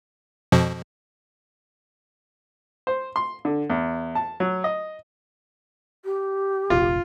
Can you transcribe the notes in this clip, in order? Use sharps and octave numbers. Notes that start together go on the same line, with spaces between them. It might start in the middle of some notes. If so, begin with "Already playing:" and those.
F2 B2 F3
C5
C6
D3
E2
A5
F#3
D#5
G4
F1 A#1 C3 F4